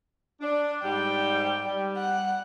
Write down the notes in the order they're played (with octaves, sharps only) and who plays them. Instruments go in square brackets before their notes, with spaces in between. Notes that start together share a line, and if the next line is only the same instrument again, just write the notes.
[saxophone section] D4
[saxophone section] G#2 G3 [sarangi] G5
[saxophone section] G3
[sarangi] F#5